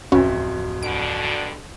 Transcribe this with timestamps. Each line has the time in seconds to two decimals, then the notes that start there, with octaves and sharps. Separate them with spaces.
0.12 D1 F2 C#3 C#4 F#4 B4 E5
0.83 G2 B2 D3 D7